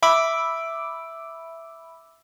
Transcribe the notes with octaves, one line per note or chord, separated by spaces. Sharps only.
E5 B5 D6 E6 D7